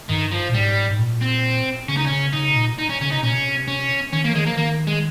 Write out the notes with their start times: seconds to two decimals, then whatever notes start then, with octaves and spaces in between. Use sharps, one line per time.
0.09 G2 D#3
0.32 F3
0.49 A#2
0.54 G#2 G3
0.91 G#2
0.99 A#2
1.21 C4
1.89 C#3 C#4
1.97 D#4
2.07 C#3 C#4
2.33 C#3 D#4
2.51 C3
2.56 A#2
2.78 D#4
2.89 C#4
3.01 C#3 C#4
3.11 C3 D#4
3.23 A#2 C#4
3.33 C3
3.68 C#4
4.12 D#3 C#4
4.24 A#3
4.31 F3
4.35 D#3 G#3
4.46 F3 A#3
4.57 D#3 A#3
4.87 G#3